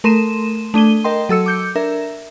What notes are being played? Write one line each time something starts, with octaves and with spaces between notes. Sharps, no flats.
A3 A#4 C6 D#7 E7
A3 D4 D#7 G7
A#4 D#5 G5 C6
F#3 A4 E6 C#7
D6 G6 C#7
D4 A#4 E5